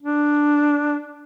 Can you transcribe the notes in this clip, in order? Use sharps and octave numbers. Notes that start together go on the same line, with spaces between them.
D4